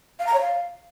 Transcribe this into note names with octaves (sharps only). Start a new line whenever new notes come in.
F5
A#5
C#5
F5